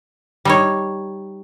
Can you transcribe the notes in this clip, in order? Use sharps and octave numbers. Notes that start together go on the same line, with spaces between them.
G3 D#4 C#5